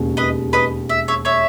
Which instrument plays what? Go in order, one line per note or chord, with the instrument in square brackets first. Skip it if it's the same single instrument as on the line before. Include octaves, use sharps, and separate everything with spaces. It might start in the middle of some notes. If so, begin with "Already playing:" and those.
Already playing: [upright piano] E1 D#2 C#3
[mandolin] B4 D#5
B4 D#5
E5
C#5 E5
C#5 E5